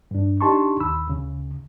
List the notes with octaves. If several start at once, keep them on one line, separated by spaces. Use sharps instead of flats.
G2 D4
D4 D#4 G4 A5 C6 C#6
D#2 B5 E6
D2 C#3